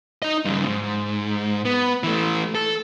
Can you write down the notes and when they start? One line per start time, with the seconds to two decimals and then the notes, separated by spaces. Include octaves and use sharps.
0.22 D#4 D#5
0.45 G2 C#3
0.66 G#2
1.65 B3
2.03 E3 A3
2.55 A4